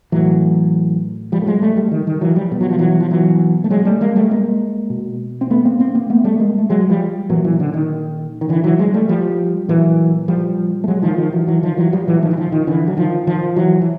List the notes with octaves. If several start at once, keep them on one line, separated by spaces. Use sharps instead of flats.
A2 E3 F#3
F3 G3
A3
F#3 G#3
G3 A3
G3 A3
D#3
D#3
E3 F#3
F3 G3
B2 G3
F#3
F3
E3 F#3
F3
E3 F#3
A3
F#3 G#3
G3 A3
G#3 A#3
G3 A3
G#3 A#3
B2
C4
A3 B3
A#3 C4
A#3 C4
A#3 C4
A3 B3
G3 A3
G#3 A#3
A3
F#3 G#3
F3 G3
A#2 E3 F#3
E3 F#3
D3
D#3
D#3
D3 E3
E3 F#3
F#3 G#3
G3 A3
F3 G3
A#2 E3 F#3
F3 G3
A3
F#3 G#3
D#3 F3
D#3 F3
E3 F#3
E3 F#3
D#3 F3
E3 F#3
F3 G3
A#2 E3 F#3
D#3 F3
E3
D#3 F3
D#3
D3 E3
F#3
D#3 F3
D#3 F3
E3 F#3
E3